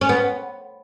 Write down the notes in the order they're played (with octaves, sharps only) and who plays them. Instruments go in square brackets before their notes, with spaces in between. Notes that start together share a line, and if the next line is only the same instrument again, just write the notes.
[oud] C#4
B3